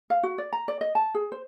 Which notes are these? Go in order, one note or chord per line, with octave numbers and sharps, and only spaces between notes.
F5
F#4
D5
A#5
D5
D#5
A5
G#4
C5